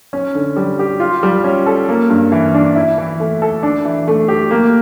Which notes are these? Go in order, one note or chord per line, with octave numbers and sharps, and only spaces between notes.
C#4
D3
G3
G4
F4
G3
C#4
A4
A#3
G2
E3
D4
E4
E3
A3
A4
D4
E3
A3
G4
A#3